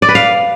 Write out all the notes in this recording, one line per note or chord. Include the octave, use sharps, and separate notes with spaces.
D5
B4
F5